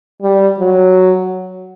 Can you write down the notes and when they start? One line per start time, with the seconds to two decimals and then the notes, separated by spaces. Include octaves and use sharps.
0.22 G3
0.59 F#3